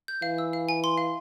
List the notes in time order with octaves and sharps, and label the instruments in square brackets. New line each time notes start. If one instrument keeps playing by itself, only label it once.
[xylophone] G6
[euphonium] E3 [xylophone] F5
[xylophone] E6
F5
G#5
C6
F5